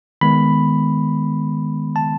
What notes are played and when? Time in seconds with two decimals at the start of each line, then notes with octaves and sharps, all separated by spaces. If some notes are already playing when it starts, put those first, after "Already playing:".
0.21 D#3 G#3 B3 B5
1.96 A5